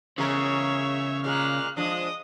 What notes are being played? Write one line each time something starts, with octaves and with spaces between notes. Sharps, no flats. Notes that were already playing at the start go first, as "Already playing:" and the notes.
E2 C#3 G#3 A#4 C#5 E5
A#2 G#3 A#3 F6 F#6
F3 G#3 D4 D#5 D#6